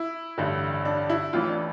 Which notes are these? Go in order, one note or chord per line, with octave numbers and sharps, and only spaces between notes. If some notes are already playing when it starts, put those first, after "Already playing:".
Already playing: E4
A1 G2 D3
D4
E4
A1 A2 E3 F4
D4